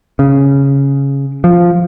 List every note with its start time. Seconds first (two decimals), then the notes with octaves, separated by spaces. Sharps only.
0.19 C#3
1.44 F3